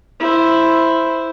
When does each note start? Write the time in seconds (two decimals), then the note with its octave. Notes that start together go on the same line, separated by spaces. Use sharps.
0.20 E4 C5